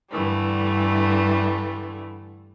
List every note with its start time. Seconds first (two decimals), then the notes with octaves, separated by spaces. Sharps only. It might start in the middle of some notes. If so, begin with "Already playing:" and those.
0.11 G2 D3 E3 G3 A3